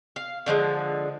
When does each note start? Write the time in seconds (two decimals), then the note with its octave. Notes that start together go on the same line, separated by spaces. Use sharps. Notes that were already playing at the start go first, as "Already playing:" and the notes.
0.16 F5
0.46 D3 F3 G3 G#3